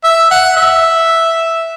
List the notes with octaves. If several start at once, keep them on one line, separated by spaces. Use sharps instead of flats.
E5
F#5
E5